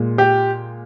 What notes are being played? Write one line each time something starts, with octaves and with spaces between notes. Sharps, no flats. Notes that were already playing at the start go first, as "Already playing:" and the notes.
Already playing: A#2 G#3
G4